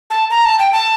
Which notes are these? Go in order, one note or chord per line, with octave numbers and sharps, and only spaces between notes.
A5
A#5
A5
G5
A5